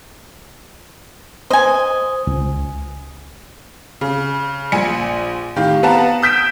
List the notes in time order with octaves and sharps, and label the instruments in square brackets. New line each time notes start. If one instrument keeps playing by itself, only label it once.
[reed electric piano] C5 [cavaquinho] D#5 G#5
[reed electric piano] C#2
[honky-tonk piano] C#3
A#1 G#5 C#7
A2 D#3 G4 F5
B3 B4 F5 F#5 A5 A#5
D#6 G6 B6 D7 E7